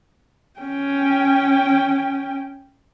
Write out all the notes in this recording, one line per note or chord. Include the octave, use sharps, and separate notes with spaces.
C#4 G5